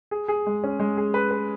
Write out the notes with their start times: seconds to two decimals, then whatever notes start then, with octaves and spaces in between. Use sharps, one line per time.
0.11 G#4
0.28 G#4
0.47 G#3
0.64 C#4
0.80 G#3
0.97 G#4
1.14 B4
1.31 B4